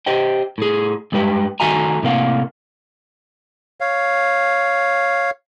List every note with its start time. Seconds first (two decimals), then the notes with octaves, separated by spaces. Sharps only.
0.06 G4 C5 D#5 G5
0.58 A2 G#4
1.12 G2 G#3 G4 B4 G5
1.60 D#3 A3 F#4 E5 G#5 A#5
2.03 A2 C3 A#3 F5 F#5
3.81 C#5 F5